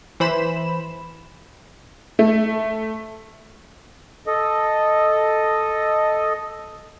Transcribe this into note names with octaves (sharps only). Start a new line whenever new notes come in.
E3 C5 B5 E7
A3
A4 D#5